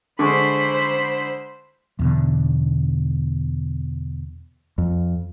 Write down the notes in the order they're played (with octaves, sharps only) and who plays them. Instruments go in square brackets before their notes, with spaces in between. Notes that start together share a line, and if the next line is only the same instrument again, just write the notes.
[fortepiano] D3 G#3 [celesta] D4 C#6 [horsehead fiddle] C5 B5
[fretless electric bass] E2 B2 D3
[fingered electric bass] F2